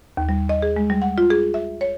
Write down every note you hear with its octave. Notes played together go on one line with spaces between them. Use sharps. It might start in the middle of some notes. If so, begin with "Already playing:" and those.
D#2
G3
D#5
G#4
G#3
G3
F#5
F4
G#4
E5
C#5